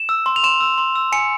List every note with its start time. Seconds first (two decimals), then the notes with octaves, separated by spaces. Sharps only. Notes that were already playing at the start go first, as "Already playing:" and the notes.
Already playing: E7
0.09 E6
0.26 C6
0.36 F7
0.43 C6 E7
0.60 E6
0.78 C6
0.96 E6
1.12 G#5 C#7